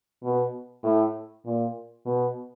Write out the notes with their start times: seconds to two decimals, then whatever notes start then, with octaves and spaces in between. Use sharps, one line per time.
0.23 B2
0.83 A2
1.45 A#2
2.05 B2